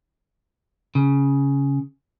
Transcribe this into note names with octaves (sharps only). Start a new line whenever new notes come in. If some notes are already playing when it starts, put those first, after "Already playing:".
C#3